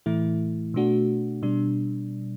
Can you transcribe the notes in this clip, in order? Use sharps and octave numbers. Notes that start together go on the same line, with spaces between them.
A2 E3 A3 E4
B2 A3 D4 F#4
B2 G3 D4